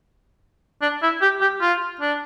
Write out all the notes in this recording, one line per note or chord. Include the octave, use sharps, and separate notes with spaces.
D4
E4
G4
G4
F4
D4